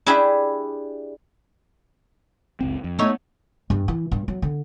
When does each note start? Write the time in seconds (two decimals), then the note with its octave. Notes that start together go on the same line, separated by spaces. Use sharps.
0.06 D4 E4 G4 G#4 E5 B5
2.61 F#1 C#2 C4
2.84 F2
2.99 A3 B3 D#4 C#5
3.70 G2
3.88 E3
4.11 G2
4.28 F#3
4.42 D3